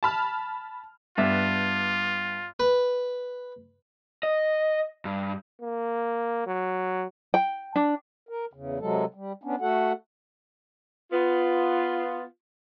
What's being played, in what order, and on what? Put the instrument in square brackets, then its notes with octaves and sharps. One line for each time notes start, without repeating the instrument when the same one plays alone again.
[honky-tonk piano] A5 B5 F6
[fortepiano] G2 B3 E5 [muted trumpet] F4
[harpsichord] B4
[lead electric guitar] D#5
G2
[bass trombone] A#3
F#3
[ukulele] G5
D4
[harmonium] A#4
E2 C#3
C3 F#3 G#3 A4
G3
B3 C#4 D4
A3 F#4 A4 F#5
[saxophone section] B3 F4